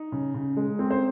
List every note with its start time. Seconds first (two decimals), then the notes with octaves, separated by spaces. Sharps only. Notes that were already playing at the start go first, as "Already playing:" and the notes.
Already playing: D#4
0.12 C#3
0.34 C#3
0.57 G#3
0.79 C4
0.91 C5